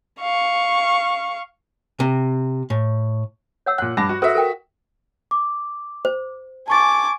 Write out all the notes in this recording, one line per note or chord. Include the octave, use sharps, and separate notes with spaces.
F5 C#6
C3
A2
C#5 F#5 E6
A#2 F#5 F#6
G2 F#5 A5 B5 D6 A#6
F#4
F#4 A4 B4 C5 E5
A4 A#4 G5
D6
C5
G#5 A5 C#6 D6 A6